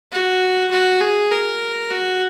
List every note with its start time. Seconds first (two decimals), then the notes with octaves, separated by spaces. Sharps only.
0.12 F#4
0.71 F#4
1.01 G#4
1.31 A#4
1.90 F#4